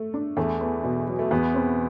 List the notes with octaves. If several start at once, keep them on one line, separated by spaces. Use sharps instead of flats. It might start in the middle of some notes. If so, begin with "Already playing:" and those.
Already playing: A3
D4
E2 A3
B3
B2
F#3
A3
E2 B3
C4